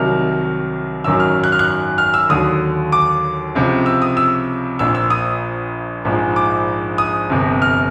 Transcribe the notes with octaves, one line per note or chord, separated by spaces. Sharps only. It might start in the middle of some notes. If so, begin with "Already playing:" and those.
Already playing: C2 C3 D#3 F#3 F6
G#1 F#2 D#3 F#3 E6
F6
F#6
F6
F#6
F6
E6
D#2 D3 F#3 D#6
D6
C#2 C3 F3
E6
D#6
E6
A#1 A#2 F3 E6
E6
D#6
A#1 G#2 F3
D6
D#6
G1 F2 C3
F6